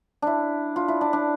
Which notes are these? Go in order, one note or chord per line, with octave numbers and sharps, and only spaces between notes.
D4 E4
F4
E4
D4
D4